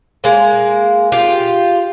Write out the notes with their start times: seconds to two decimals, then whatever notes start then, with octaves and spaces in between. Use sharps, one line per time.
0.24 G#3 A#3
1.12 F4 G4